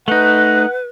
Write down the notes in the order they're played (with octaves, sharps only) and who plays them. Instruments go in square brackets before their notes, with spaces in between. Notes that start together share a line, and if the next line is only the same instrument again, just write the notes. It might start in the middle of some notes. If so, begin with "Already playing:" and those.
[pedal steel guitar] A3 D#4 [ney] B4 [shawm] F#5